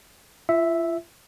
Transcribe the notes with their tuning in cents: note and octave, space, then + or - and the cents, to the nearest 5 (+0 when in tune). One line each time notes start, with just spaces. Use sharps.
F4 -40 E5 +0